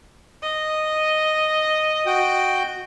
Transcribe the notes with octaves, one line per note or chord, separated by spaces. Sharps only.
D#5
F#4 G5